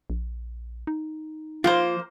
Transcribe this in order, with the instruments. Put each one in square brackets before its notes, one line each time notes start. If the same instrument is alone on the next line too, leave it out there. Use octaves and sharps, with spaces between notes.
[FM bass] A#1
D#4
[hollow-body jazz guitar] F3 F4 [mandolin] A#3 C5